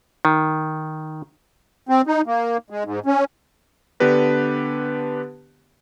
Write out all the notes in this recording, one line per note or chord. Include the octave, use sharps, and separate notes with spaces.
D#3
C4
D#4
A#3
G#3
G#2
C#4
D3 B3 D4 G4 B4 A#6